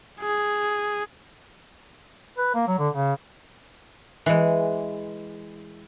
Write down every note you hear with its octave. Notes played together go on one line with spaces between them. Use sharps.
G#4
B4
A#3
F#3
D3
C#3
E3 G#3